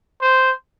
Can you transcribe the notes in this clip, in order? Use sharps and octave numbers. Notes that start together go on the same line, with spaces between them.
C5